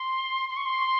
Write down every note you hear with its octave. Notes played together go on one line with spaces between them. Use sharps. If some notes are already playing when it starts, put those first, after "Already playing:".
Already playing: C6
C6
C#6
C6